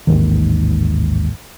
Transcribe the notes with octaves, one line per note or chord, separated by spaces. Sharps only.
A1 D#2 G#2 D#3